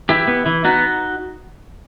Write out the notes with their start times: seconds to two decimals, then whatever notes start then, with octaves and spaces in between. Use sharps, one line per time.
0.09 E3 E4 G4
0.28 B3
0.46 E3 E4
0.64 B3 D#4 F#4